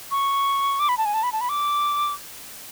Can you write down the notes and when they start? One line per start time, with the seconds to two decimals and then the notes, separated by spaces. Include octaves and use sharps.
0.11 C#6
0.80 D6
0.89 B5
0.98 A5
1.05 G#5
1.14 A5
1.23 B5
1.32 A5
1.41 B5
1.49 D6